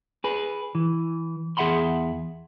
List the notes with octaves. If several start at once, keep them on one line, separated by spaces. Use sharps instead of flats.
G#4 B4
E3
E2 G#4 E5 F#5 B5 C6